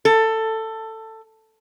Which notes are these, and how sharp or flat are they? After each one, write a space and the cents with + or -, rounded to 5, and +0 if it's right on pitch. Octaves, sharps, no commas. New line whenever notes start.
A4 +15